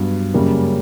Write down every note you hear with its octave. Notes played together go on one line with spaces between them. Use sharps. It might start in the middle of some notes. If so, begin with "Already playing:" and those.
Already playing: G2 F#3 B3
F#2 C#3 G3 A#3